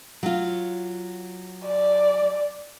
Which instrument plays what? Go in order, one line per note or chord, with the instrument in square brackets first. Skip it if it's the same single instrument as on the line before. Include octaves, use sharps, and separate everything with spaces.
[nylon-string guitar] F#3 F4
[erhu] D5